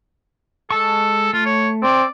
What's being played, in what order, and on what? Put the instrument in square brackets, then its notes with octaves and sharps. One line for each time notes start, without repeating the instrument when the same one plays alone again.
[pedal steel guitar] G#3 A5 C#6 [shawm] A4
[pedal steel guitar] A3 [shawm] F4
[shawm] C#5
[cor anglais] C4 [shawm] D5